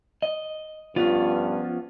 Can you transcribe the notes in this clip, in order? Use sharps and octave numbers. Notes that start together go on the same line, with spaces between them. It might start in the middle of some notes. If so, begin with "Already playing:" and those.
D#5
G2 F3 B3 C#4 F4